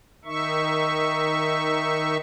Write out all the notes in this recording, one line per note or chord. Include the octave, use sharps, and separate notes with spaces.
D#3 D#4 E5 C#6